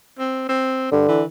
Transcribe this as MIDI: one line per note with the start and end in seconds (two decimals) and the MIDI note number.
0.19 0.46 60
0.49 0.88 60
0.92 1.05 43
0.92 1.22 50
1.08 1.25 52